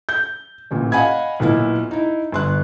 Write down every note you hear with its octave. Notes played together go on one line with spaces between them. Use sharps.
G6
A1 A#2
D#5 F5 F#5 G#5 B5 G#6
B1 A#2 B3 E4
D#4 E4
G1 C6 F#6